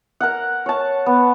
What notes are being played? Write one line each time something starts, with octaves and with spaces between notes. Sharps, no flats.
A#4 F#5
C#5 A5
B3